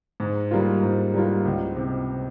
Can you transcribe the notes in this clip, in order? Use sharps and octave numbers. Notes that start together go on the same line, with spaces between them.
G#2
G3 A#3 F4
G#2
G3 A#3 F4
C#2
C3